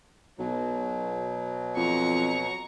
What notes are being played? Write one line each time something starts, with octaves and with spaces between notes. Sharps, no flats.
B1 B2 F#3
F2 A#5 C#6